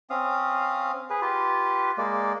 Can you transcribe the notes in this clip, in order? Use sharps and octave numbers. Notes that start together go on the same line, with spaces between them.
C4 C#4 F5 D#6
G#4 B4
F4 G4 B4
G#3 A#3 D5